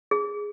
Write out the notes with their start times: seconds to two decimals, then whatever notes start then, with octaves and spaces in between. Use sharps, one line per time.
0.11 G#4